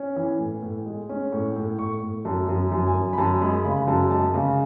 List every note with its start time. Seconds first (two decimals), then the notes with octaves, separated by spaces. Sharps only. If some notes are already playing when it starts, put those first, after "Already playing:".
Already playing: C#4
0.16 E3
0.39 A2
0.62 A2
0.86 G#3
1.09 C#4
1.32 A2 C#6
1.56 A2
1.78 A2 C#6
2.02 A2
2.25 F#2 A5
2.49 F#2
2.72 F#2
2.87 G#5
2.95 F#2
3.13 B5
3.18 F#2 A5
3.41 G#3 B5
3.65 C#3 B5
3.87 F#2 A5
4.11 G#3 A5
4.34 C#3